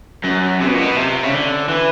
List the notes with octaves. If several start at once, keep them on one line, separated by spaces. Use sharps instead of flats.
F#2
C3
B2
A#2
B2
C3
C#3
D3
E3